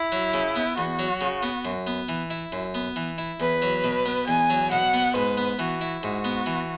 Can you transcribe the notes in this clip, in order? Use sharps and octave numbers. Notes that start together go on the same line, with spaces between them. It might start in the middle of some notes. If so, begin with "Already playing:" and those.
Already playing: E4
F#3
C#3
B3
E2 F#4
F#3
C#3
B3
F#2
B3
E3
E4
F#2
B3
E3
E4
E2 B4
F#3
B2
B3
E2 G#5
F#3
B2 F#5
B3
G#2 B4
B3
E3 F#4
E4
G#2 F#4
B3
E3